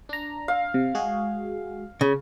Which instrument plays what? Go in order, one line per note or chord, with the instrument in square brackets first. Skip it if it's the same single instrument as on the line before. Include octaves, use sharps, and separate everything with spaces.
[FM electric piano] D4 A#5
[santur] F5
[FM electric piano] C3
G#3 F#4 G#4
[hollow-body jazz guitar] C#3